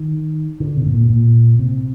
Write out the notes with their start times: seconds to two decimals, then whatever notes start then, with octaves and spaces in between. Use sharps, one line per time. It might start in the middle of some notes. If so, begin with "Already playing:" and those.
Already playing: D#3
0.60 D3
0.77 C3
0.86 A2
0.93 A#2
1.10 A#2
1.59 C3